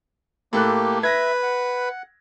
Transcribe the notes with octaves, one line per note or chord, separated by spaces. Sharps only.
A2 A#3 G4 A4 F#6
B4 E5 G#6 A#6
F#5